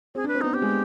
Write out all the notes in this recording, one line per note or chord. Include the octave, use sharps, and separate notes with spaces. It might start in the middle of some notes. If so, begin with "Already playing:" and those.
C4 G#4
D4
B4
C4
B3 D#4
B3 G4
G#3